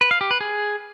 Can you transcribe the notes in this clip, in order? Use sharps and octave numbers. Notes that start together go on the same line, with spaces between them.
B4
F5
G4
B4
G#4